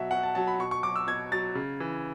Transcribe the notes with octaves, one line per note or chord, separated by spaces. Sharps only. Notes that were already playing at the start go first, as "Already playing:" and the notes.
Already playing: B2 F#3 E5 F#5
B2 F#5
A5
F#3 A5
B5
B2 C#6
C#6
F#3 D6
E6
B2 G#6
F#3 A6
C#3
E3